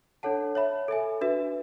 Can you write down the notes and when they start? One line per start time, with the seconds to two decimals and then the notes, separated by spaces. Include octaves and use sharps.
0.23 D4 A4 C#5 F#5 A5
0.55 C#5 E5 B5
0.88 A4 E5 G#5
1.21 D4 F#4 B4 E5